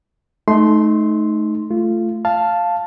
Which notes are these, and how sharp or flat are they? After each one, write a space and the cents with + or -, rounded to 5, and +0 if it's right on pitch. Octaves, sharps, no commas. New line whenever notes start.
A3 -25 D#4 +0 C6 +0
A3 +0 F4 -20
F5 +0 A5 +0